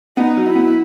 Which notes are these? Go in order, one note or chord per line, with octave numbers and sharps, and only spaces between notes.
B3 D#4
F#3
E4
B3